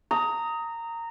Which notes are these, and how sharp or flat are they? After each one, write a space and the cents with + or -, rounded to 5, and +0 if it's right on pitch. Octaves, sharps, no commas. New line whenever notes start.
A#5 -15 D#6 +15